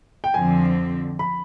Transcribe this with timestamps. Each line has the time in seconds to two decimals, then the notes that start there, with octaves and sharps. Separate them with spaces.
0.24 G5
0.34 F2 D3 F3 C4 G#5
1.19 B5